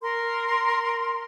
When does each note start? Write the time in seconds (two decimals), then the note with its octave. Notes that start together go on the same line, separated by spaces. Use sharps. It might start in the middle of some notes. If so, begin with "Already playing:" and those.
0.02 A#4 C6